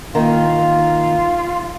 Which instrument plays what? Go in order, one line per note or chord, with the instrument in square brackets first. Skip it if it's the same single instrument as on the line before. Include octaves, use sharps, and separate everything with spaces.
[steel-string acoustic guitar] D#3 A#3 [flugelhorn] F4